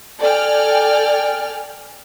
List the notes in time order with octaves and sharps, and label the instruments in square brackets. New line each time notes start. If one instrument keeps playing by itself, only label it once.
[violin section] A4 D5 G5 G#5 F6